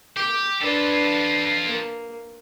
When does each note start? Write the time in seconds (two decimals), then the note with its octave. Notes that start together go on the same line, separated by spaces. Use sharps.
0.17 G4 D6
0.61 D4 F4 A4 B4
1.65 A#3